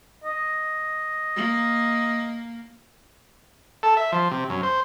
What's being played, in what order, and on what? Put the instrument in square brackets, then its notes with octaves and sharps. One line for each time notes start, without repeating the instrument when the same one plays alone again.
[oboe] D#5
[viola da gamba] A#3
[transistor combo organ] A4
E5
F3
C3
F#2
C5